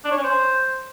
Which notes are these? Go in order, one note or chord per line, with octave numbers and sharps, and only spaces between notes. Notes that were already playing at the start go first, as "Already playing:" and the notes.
D4
C#5
C#4
C5